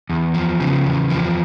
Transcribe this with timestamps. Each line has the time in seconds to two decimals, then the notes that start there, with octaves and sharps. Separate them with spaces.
0.10 E2
0.34 F3
0.60 C#3
0.85 E2
1.10 F3